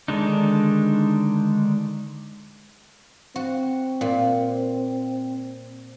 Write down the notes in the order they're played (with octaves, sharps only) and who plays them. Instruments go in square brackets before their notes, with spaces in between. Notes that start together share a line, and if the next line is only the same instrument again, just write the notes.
[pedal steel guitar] D3 D#3 G#3 D4 D#4
[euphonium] C4 [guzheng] F#4
[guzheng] A#2